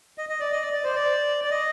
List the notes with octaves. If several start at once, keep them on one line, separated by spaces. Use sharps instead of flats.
D#5
D#5
D5
D#5
D5
D5
C5
D5
D5
D#5